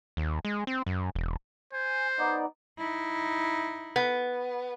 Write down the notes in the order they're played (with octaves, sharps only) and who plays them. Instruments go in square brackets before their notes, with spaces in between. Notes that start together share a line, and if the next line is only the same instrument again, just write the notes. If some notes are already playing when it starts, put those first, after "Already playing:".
[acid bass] D#2
G#3
C4
F#2
E1
[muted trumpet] C5 [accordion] G#5
[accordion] B3 D#4 D5
[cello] D#4 E4
[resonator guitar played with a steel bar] B3